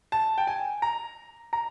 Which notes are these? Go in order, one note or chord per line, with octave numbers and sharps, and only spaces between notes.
A5
G5
G#5
A#5
A#5